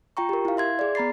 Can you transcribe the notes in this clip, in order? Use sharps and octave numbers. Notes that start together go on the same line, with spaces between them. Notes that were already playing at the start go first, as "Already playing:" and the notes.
F4 G5 A#5 C#6
G4 A#4
E4 F5
E5 C6 G#6
G#4 D5
B3 A#5 B5 A6 C7